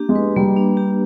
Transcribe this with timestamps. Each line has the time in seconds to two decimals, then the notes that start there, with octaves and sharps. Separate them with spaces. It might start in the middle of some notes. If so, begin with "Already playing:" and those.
Already playing: A#3 D4 G4
0.09 G#3
0.15 B4
0.36 G3 A#3
0.56 D4
0.77 G4